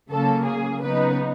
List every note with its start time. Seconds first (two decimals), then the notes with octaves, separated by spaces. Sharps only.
0.10 C#3 F#3 A#3 A4
0.47 G#4
0.82 C#3 F#3 B3 D#4 B4